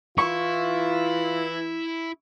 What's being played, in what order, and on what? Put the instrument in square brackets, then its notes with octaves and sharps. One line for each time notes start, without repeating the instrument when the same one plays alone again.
[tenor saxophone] E3 [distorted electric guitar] E4 [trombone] F4 [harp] C#6